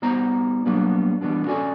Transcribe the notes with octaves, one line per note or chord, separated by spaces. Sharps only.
G3 B3 D#4 C5 A#5
F#3 G3 A#3 B3 D4
E3 G3 B3 D4
B3 C#4 F#4 A4 D5 G#5